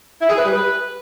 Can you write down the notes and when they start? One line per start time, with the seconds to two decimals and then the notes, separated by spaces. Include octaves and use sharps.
0.21 E4
0.29 G#4
0.37 B4
0.45 G3
0.53 B4